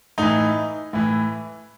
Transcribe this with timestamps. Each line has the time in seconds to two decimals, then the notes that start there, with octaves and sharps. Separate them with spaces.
0.18 A2 E3 D#4
0.93 A2 E3